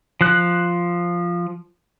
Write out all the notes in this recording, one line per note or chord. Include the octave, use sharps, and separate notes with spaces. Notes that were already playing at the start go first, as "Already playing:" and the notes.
F3 F#6